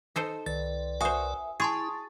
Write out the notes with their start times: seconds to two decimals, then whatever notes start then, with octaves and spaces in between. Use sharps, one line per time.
0.16 D#4 A4 C5
0.46 C2 D#3 B4 D5 A6
1.01 F#4 A#4 C5 E5 G#5 D#6
1.60 E4 G#4 A5 C6 C#6 D#6 A6